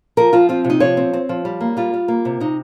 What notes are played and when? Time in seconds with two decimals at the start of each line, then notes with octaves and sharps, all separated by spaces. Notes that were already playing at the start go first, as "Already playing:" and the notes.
0.17 F3 A#4
0.33 F3 F4
0.49 C4 F4
0.64 C3
0.70 D#4
0.80 F3 C#5
0.97 C4
1.13 C4
1.29 F3
1.45 G3
1.61 A#3
1.77 G3 F4
1.93 G3
2.08 A#3
2.25 C3
2.40 C3 D#4